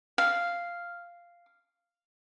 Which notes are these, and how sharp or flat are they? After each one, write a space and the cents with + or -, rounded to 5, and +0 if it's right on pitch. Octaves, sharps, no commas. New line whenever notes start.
F5 -5